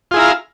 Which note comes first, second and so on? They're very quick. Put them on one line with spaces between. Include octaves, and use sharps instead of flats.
F4 G#4 E4 A#5 F5